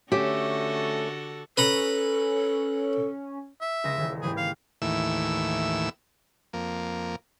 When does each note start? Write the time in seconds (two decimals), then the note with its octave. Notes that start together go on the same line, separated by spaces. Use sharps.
0.12 D3 A3 C#4 F#4 G4 A4
1.57 C#4 A4 B4 A#5 B5
3.61 E5
3.84 C#2 D#5 A#6
3.97 D#1 C#2 E3
4.22 G#2 E3 G4 G#4
4.37 F5
4.82 D#2 A2 E3 E6
6.53 F2 A#3